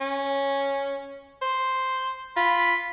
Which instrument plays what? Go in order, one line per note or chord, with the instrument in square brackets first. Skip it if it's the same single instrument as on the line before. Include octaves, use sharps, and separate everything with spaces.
[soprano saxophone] C#4
C5
[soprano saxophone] F4 [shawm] B5